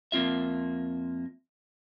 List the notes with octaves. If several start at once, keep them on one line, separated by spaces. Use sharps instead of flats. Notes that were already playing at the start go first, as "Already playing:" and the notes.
F2 A#3 C4 F4 E5